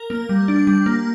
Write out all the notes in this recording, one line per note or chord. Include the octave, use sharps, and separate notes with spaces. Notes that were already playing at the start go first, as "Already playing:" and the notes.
Already playing: A#4
A#3
G3
D4
G3
A#3